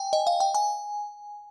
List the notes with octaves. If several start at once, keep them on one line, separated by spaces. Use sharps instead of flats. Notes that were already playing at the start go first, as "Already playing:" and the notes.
Already playing: G5 G#5
D#5
F5
G5
G#5